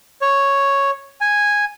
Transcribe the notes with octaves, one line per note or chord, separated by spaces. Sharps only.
C#5
G#5